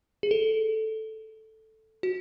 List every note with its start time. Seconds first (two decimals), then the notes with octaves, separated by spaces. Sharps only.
0.23 G#4
0.31 A4
2.03 F#4